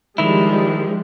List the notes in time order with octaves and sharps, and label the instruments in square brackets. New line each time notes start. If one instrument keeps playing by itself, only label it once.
[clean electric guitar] D#3 E4 [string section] F3 G3 G#3